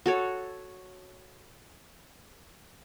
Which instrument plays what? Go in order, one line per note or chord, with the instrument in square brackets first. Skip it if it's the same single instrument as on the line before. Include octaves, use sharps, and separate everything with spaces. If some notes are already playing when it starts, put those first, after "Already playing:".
[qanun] F#4 A4 C#5